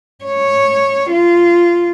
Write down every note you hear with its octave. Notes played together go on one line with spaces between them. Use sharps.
C#5
F4